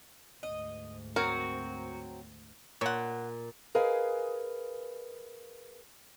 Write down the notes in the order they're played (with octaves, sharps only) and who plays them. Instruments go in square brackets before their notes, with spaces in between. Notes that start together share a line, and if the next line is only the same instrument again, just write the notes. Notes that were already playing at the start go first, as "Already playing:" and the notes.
[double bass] D2 G#2 [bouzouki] D#5
[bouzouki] F#3 C4 [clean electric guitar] F#4 [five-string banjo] A#4
[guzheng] A#2 [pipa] C#5 F#5
[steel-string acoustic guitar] G#4 A#4 B4 D#5 F5 G#5